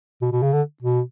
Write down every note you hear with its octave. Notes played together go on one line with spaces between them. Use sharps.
B2
B2
C#3
D3
B2